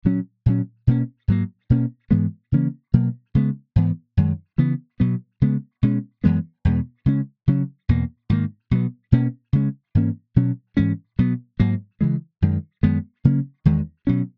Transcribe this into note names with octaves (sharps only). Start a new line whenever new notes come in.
A#2 F#3 C#4
A#2 F#3 C#4
B2 A#3 C#4
G#2 F#3 A#3
B2 A#3 C#4
G#2 E3 G#3 B3
C#3 E3 A#3 C#4
B2 F#3 A#3
C#3 G#3 B3
G#2 E3 B3
F#2 D#3 G#3
C#3 E3 B3
B2 F#3 B3
C#3 G#3 B3
B2 G#3 C#4
F#2 E3 G#3 B3
E2 B2 G#3 B3
C#3 G#3 C#4
C#3 F#3 C#4
E2 B2 A#3
G#2 D#3 A#3
B2 F#3 B3
B2 A#3 C#4
C#3 G#3 C#4
G#2 E3 A#3 C#4
B2 F#3 C#4
G#2 E3 G#3 C#4
B2 F#3 B3
G#2 F#3 A#3
C#3 E3 G#3
F#2 D#3 G#3
F#2 D#3 G#3 B3
C#3 F#3 A#3 C#4
E2 D#3 G#3
B2 F#3 C#4